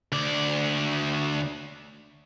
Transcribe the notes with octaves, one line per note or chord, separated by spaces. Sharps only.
D2 D5